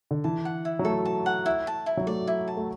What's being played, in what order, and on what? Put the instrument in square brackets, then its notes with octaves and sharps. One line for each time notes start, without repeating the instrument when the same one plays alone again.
[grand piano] D3
[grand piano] E3 [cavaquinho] A5
[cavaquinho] F#5
E4
[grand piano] F#3
[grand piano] A3 [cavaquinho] A4
[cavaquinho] A5
F#5
E4
A5
E4
[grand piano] F#3
[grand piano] A3 [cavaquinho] D5
[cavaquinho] E4
A5
[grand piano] A3